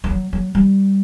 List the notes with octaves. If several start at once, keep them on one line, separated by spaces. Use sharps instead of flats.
F3
F#3
F#3
G3